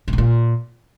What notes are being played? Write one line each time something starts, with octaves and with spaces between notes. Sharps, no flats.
A2
B2
A#2